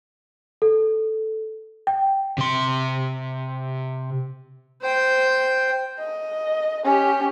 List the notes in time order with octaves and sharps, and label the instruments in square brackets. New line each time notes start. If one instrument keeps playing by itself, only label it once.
[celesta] A4
G5
[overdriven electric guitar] C3 C6
[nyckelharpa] C5 G5
[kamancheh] D#5
C#4 G4